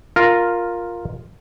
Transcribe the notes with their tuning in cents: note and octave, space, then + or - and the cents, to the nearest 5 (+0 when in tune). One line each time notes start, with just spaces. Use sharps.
F4 +5 A#4 +0